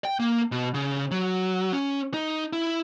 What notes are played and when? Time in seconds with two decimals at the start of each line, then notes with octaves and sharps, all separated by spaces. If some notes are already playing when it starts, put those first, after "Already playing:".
0.05 G5
0.20 A#3
0.52 B2
0.74 C#3
1.11 F#3
1.73 C#4
2.14 D#4
2.53 E4